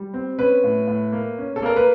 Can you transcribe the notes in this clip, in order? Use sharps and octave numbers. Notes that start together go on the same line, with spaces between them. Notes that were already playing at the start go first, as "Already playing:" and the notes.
Already playing: G3
C4
C#4 B4
A2
A2
A#3
C#4
A4
A#3 A#4
B4